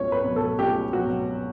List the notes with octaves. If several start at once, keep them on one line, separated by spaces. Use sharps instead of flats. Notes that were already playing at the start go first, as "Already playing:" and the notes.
Already playing: C#2 B2 F#3 C#5
B4
B2 F#3
A4
C#2 G4
B2 F#3 F#4